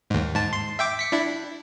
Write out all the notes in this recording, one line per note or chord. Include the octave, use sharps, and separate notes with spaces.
D#2 G#2
G#2 A5
C6
E5 G5 D6
B6 C#7
D4 E4